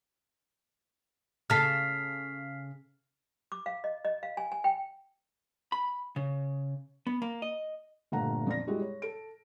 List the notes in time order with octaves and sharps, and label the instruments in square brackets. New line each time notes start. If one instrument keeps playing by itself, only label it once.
[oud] C#3 A4 [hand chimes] F6 B6 C7
[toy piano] D6
F5
D#5
D#5
F5
G#5
G#5
G5
[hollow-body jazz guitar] B5
C#3
B3
A#3
D#5
[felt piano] G1 A#2 A3 F#5 A#5
F2 D5 A#6
G3 G#3 E4 F#4
C#5
A4 D7